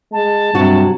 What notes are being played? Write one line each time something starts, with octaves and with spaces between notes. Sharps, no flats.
G#3 A5
G2 C3 F#3 F#4